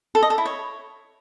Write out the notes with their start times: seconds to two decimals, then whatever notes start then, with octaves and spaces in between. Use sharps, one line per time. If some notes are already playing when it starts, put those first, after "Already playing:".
0.15 A4
0.23 D#5
0.30 A4
0.38 E4
0.45 C#5